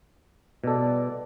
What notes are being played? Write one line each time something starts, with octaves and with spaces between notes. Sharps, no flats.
E2 B2 G3 A4 D5